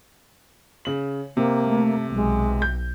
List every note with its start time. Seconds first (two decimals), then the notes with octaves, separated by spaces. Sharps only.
0.85 C#3 F#7
1.37 C3 A#3
1.66 A3
2.15 B1 G#3
2.62 G6